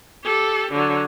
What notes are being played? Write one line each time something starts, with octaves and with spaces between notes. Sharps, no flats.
G4 A4
D3 F#3